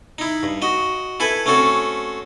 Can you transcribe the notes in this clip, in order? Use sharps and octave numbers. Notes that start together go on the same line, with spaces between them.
D#4 E4
G2
F#4 D#5
E4 A4 B4 G#5
A3 C4 C#4 F#4 A4